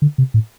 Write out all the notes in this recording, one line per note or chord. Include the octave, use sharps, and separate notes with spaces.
D3
C3
A2